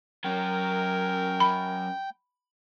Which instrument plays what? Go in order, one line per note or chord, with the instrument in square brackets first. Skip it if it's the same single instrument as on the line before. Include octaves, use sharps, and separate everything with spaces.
[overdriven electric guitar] F#3 C#4 [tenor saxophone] A#4 [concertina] G5
[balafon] B5